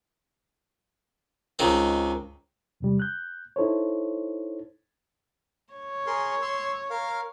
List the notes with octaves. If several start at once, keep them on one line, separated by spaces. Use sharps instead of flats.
C#2 D#3 C4
E2 C3 G3
F#6 G6
D#4 E4 A4 C5 C#5
C#5
G#4 A#4 C6
C6 E6
A#4 F5